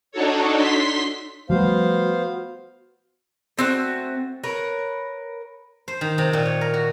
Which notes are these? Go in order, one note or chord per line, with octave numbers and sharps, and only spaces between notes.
D4 D#4 F#4 A4 C#5
C6 B6
F3 G3 A3 B3 F#4 C5 F5
A3 C4 E4 F#4
A#4 B4 C#5
C5
D#3
C3
A#2
C#5
A#4
F#4